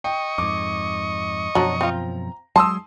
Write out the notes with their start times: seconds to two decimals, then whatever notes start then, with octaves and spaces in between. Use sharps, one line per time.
0.04 D#5 G5 C#6
0.38 F2 G#2 D6
1.55 F#2 B2 F3 F#3 D4 A#5
1.81 C4 F4
2.56 F#3 G#3 A5 C6 D#6 E6